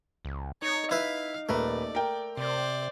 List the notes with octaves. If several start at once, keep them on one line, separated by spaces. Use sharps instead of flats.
C#2
D#4 C#5
E4 B4 E5 F5
D#1 A3 A#4 B4 D5
A#4 G5
C3 C5 D5